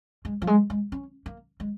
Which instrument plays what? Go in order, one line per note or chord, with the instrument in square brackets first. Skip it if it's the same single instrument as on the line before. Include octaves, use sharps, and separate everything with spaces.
[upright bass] G#3
F3
G#3
G#3
C#4
A#3
G#3